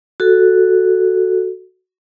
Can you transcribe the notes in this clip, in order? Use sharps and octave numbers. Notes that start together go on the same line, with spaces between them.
F#4 A4